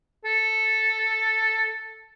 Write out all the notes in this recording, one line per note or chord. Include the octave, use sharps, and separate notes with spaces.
A4